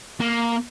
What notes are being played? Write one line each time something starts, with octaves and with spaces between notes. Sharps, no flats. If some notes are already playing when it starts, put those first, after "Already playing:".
A#3